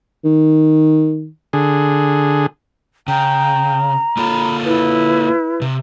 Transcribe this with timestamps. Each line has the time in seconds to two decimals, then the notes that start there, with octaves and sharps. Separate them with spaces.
0.24 D#3
1.53 D3 G#4
3.08 C#3 G5 A#5
4.17 A#3 F4 A4 B5
4.65 E4 B4
5.61 C3